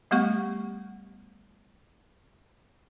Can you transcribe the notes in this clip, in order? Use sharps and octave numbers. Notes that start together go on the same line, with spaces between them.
G3 A3 B3 G4 F#5 C#6